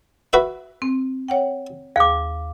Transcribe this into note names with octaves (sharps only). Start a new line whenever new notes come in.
F#4 B4 E5
C4
C#5 F#5 G5
D#2 G#4 F5 D6